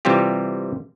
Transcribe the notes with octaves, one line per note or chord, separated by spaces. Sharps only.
C3 E3 G3 C4 F4 G4